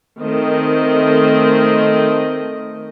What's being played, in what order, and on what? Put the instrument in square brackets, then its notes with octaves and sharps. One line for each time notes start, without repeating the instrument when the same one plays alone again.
[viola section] D#3 A3 C4 D#5